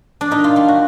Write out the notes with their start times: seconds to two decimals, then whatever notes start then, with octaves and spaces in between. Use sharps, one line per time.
0.21 D4
0.31 A#2 D#4
0.44 F4
0.56 G3 F4
0.68 F#4